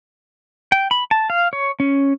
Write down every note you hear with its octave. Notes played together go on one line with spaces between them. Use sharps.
G5
B5
A5
F5
C#5
C#4